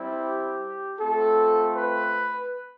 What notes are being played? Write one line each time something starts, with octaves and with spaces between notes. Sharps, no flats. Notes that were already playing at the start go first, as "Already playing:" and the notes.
Already playing: G3 C4 E4
G4
A3 C4 F4 A4
B4